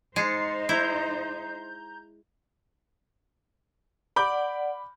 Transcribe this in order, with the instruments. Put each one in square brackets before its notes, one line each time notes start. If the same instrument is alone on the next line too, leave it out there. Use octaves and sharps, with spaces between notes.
[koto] G#3 [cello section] D#4 C5 [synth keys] A6 C7 C#7
[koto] E4 [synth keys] A#5 G6
[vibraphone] D5 F#5 [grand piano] B5 D6 G6